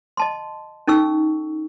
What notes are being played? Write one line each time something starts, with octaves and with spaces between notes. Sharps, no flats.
D#5 A5 C6
C#4 D#4 A4 C#6 E6